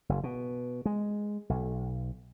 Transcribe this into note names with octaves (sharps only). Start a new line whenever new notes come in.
F#1
B2
G#3
B1